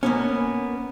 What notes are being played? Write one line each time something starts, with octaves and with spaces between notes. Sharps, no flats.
A#3 B3 C#4